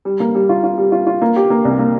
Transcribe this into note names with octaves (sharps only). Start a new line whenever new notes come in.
G3
A#3
G3
F4
F4
G3
F4
F4
A#3
G4
A#3
C2
A#3